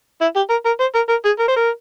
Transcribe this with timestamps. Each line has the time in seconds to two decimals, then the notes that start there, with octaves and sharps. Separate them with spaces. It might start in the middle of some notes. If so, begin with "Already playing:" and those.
0.21 E4
0.36 G4
0.50 A#4
0.65 A#4
0.80 C5
0.95 A#4
1.09 A#4
1.25 G#4
1.39 A#4
1.48 C5
1.56 A#4